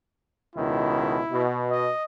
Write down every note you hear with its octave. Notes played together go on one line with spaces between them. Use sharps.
C#2 B2 D#3 E4
B2
D#5